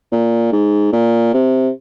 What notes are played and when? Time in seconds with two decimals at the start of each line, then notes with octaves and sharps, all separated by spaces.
0.12 A#2
0.52 G#2
0.93 A#2
1.33 C3